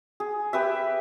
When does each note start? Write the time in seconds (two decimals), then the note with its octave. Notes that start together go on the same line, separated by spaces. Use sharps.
0.20 G#4
0.53 G4 B4 E5